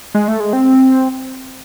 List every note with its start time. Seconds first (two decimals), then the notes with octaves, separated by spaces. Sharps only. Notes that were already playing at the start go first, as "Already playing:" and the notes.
0.14 G#3
0.28 A3
0.40 G#3
0.53 C4